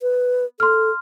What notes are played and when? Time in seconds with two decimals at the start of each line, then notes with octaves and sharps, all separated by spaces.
0.02 B4
0.60 A4 C6 F6